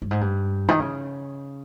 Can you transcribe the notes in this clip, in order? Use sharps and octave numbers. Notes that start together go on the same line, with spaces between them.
G2
G#2
G2
D#3
C#3